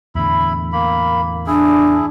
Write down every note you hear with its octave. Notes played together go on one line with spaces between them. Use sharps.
E2 A2 D3 E4 B5
A#3 B5
D4 E4 G#4